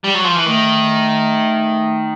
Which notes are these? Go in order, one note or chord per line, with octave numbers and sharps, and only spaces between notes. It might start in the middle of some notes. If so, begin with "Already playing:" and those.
G3
F#3
F3
E3
D#3 A3